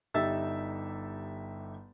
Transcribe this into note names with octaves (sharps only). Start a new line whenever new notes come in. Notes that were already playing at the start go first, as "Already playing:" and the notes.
G1 D#4 G4 E5 E6 A6